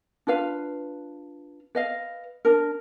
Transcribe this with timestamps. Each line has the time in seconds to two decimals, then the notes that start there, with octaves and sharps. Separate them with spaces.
0.27 D4 F4 B4 F5
1.75 B4 D#5 F5
2.45 D4 A#4